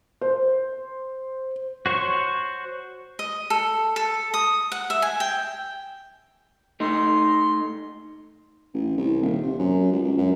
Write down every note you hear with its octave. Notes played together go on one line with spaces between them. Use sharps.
C5
F#4 C5 C#5 C#6
D#5
A4
A4
D#6
F#5
E5
G#5
G5
A3 D#4 C6
A1
C2
D#1
C3
F#2
C#2
C#2
F#2